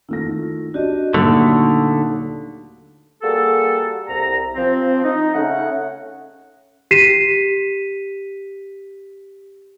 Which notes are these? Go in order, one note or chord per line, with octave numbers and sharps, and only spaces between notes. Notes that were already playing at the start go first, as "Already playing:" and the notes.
D#3 A3 E4 F4 A#6
D4 F#4 G4 D5 D#5
D#2 A#2 D3 F#3 A3 D#4
G3 A#3 F#4 G#4 A4
C2 A#5
F3 C4
D#4
C#3 A3 C#4 F#5
G4 B6 C7 D#7 E7